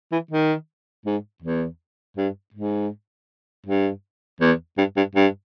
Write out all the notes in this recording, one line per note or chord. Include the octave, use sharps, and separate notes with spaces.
E3
D#3
G#2
E2
G2
G#2
G2
E2
G2
G2
G2